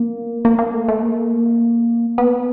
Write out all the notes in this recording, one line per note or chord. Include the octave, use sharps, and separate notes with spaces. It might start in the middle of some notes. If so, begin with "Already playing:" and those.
Already playing: A#3
A#3
A#3
A3
A3
A#3
B3